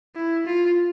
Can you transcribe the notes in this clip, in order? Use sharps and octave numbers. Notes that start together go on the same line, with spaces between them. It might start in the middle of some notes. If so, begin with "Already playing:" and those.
E4
F4